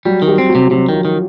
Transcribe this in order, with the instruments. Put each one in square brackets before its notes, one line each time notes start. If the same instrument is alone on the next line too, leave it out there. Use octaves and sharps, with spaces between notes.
[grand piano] F#3 F#4 [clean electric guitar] G3
[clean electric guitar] D#3
[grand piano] G3 G4
[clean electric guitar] C4
[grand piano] F#3 F#4
[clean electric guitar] C3
[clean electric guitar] C3 [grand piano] F#3 F#4
[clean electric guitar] D#3 [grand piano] F3 F4
[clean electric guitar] D#3